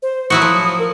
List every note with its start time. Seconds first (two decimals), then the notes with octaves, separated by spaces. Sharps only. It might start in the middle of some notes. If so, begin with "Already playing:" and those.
0.02 C5
0.30 F#3 E4 F#4 D#6
0.42 F3
0.63 D#6
0.79 A#4